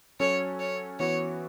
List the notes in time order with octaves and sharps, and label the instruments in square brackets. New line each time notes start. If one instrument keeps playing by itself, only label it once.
[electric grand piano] F#3 C#4 F#4 A4 [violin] C#5
[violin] C#5
[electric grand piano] E3 B3 F#4 [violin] C#5